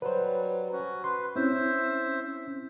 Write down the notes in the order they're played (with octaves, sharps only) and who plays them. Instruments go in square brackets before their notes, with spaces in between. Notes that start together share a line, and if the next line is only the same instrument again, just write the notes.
[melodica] F#3 G3 [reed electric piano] B4 C5
[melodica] C#4 F#4
[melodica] B4 [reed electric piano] C6
[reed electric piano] C4 C#4 E4 [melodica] C5 E5